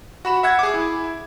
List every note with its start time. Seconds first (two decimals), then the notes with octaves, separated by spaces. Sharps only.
0.25 F#4 B5 E7
0.43 E5 F#5 G#6
0.59 G#4 D6
0.74 E4